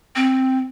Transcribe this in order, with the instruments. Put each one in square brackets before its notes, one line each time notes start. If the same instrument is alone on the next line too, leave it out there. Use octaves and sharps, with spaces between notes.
[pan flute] C4